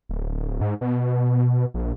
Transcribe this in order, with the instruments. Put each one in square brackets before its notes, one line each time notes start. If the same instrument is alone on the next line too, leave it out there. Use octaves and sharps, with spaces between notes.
[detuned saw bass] D1
G#2
B2
A#1